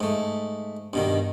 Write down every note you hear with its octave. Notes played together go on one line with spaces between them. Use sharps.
G#2 A3
G2 B2 D#3